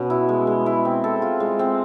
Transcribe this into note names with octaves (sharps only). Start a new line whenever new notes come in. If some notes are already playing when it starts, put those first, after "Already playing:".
Already playing: B2 C#4
E4
G#3
G#3
E4
C4
A4
F4
G#3
C4